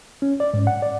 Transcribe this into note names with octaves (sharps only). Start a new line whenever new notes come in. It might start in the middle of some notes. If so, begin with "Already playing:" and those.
C#4
D5
G#2
F#5
D5